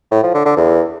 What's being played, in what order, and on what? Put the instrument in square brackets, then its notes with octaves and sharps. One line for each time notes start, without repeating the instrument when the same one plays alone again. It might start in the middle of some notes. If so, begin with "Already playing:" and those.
[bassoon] A2
F3
D3
D3
E2